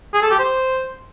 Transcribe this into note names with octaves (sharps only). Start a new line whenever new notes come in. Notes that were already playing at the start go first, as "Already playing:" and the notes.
G#4
A4
G4
C5